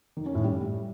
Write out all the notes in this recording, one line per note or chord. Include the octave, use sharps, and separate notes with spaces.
D#3
C#4
A2
G3